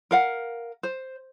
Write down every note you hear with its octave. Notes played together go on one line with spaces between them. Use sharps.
A#4 F5 F#5
C5